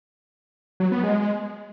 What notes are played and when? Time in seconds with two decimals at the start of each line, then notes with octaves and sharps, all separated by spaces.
0.80 F#3
0.92 B3
1.03 G#3